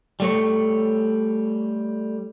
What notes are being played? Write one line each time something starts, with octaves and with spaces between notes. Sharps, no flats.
G3 A3 C#5